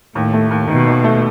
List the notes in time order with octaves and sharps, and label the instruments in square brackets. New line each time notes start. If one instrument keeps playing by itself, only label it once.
[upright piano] D#2 [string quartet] A2
[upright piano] A3
D#2
[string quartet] B2 [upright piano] D#3
[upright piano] D#2
A3